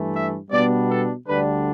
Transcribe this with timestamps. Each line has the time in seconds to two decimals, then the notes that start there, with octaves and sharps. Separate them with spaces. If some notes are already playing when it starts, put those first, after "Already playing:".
Already playing: G2 E3 A3
0.14 E5
0.51 B2 G3 B3 D4 D5
0.90 A4
1.28 D2 D3 G3 D4 B4